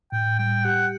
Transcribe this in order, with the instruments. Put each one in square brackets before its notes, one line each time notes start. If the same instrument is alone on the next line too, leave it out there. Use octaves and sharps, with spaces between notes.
[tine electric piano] A2 [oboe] G5
[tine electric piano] G3 [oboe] G5
[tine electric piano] G4 [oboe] F#5